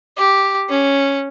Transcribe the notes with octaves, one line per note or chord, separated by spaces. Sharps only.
G4
C#4